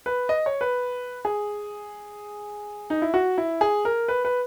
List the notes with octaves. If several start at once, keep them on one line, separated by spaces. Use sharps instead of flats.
B4
D#5
C#5
B4
G#4
D#4
E4
F#4
E4
G#4
A#4
B4
B4